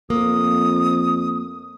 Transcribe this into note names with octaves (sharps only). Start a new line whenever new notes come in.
F2 A#3 D#6